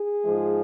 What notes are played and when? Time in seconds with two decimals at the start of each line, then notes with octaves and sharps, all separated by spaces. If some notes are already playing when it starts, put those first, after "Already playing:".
Already playing: G#4
0.23 G#2 F3 G#3